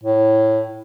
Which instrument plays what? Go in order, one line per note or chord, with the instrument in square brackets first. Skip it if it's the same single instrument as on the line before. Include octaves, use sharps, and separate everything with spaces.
[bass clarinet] A2